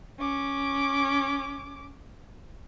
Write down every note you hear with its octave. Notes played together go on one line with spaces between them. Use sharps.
C#4 D6